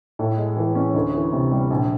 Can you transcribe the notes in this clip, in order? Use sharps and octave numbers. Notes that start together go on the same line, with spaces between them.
A2
G#3
E3
C#4
D2
E3
C3
G3
A#1